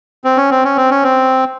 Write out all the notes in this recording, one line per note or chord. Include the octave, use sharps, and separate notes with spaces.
C4
C#4
C4
C#4
C4
C#4
C4